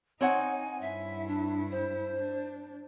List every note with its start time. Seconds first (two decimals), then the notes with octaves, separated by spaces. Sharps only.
0.21 C4 D#4 C#5 F#5 G#5
0.81 G2 E4 E5
1.28 D4
1.71 C5
2.17 D4